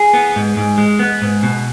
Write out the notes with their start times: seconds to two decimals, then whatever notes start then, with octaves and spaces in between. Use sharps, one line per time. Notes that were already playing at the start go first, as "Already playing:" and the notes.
Already playing: G#4
0.13 B3
0.36 G#2
0.57 G#2
0.78 G#3
0.99 B3
1.22 G#2
1.43 B2